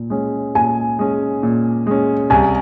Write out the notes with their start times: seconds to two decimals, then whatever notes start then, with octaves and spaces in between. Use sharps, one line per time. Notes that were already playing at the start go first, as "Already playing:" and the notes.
Already playing: A#2
0.10 G#3 C#4
0.55 A#2 G#5
0.99 G#3 C#4
1.43 A#2
1.87 G#3 C#4
2.30 C2 G#5